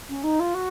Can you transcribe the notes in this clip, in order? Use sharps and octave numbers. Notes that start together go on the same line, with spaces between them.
C#4
D#4
F4
F#4